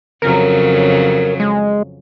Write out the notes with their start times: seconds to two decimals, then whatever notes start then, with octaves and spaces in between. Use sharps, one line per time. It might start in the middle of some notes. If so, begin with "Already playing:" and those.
0.22 F2 C#3 F#3 A#4
1.40 G#3